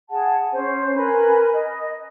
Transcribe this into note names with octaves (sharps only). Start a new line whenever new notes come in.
G#4 F#5 A5
C#4 C5
A#4 B4 G#5 B5
D#5